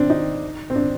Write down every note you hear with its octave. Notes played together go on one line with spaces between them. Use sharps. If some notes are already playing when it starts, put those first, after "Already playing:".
Already playing: C4 D4
D#4
C4
D4